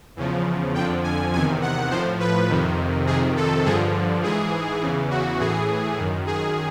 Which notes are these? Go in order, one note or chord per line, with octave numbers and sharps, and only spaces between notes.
E2 C#3 F3
F2 D3 F3 G5
G#5
E2 C3 D#3 G#5
F#5
A2 F3 C5
B4
F2 C3 D#3
F2 C3 D#3 G#4
A4
G2 D3 F3 G#4
G#2 E3 G#4
E2 C#3 E3
F#4
A2 E3 G#4
F#2 D#3
G#4